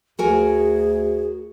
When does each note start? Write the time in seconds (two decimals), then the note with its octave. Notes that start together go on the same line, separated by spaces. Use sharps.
0.19 D2 F#4 G#4 A#4 G#5